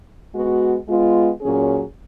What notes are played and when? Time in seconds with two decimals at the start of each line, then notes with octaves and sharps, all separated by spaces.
0.34 G#3 B3 F#4
0.88 G#3 B3 F4
1.41 A#2 F#3 C#4 G#4